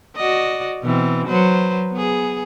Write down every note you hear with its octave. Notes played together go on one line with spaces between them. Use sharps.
F#4 D5 D#5
B2 E3 C4
F#3 B4 C5
B3 G#4